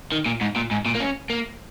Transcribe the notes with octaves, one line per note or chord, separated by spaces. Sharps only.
D#3
A#2
G#2
A#2
G#2
A#2
A#3
C#4
A#3